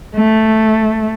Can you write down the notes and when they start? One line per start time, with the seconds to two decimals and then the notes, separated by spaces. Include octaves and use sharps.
0.14 A3